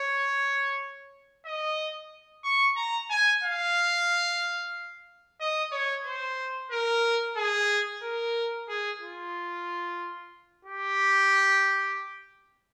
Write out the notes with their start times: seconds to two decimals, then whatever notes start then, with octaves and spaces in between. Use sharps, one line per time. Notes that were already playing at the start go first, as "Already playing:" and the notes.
Already playing: C#5
1.45 D#5
2.44 C#6
2.76 A#5
3.10 G#5
3.43 F5
5.40 D#5
5.72 C#5
6.05 C5
6.71 A#4
7.36 G#4
8.03 A#4
8.68 G#4
9.01 F4
10.65 G4